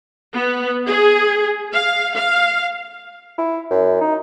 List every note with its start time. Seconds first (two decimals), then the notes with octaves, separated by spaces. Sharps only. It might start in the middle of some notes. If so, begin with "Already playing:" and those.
0.34 B3
0.88 G#4
1.74 F5
2.15 F5
3.38 E4
3.71 F#2
4.01 D#4